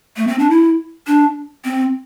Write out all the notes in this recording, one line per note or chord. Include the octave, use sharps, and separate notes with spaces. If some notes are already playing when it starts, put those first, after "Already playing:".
A3
C4
D4
E4
D4
C4